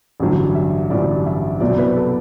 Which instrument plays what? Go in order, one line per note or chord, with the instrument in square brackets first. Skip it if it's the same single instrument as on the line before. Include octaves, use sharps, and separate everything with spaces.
[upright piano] A1 G2 D3 F#3
E5
A1 G2 D3 F#3 D5
E5
C2 B2 F#3 D5
B4
A4